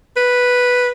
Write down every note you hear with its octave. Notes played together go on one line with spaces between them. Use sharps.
B4